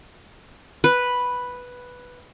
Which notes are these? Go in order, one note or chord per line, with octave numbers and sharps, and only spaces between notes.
B4